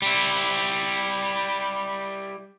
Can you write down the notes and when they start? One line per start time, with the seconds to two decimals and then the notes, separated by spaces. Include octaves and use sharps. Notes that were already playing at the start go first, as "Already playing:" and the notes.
0.02 G3 E4